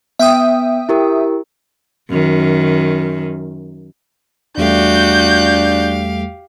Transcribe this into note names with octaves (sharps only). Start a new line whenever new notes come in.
B3 E5 G5 D#6
E4 G4 A#4
F#2 D#3
E2 G3 A3 D4 F#4 G4 F5 G6